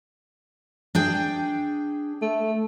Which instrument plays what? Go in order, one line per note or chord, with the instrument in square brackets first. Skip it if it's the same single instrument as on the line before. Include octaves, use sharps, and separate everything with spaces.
[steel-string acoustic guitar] D4 G#4 G5
[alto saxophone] A3